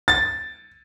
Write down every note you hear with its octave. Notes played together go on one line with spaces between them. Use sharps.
A6